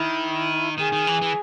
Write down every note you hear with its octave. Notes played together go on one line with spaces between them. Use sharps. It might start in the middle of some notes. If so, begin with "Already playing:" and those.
Already playing: D#3 E4
D#3 G#4
D#3
E3
E3